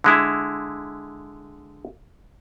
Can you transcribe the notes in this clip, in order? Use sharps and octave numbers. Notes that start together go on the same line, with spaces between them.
D3 G#3 E4